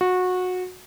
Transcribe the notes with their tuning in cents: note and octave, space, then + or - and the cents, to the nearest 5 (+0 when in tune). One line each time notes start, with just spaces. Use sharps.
F#4 -20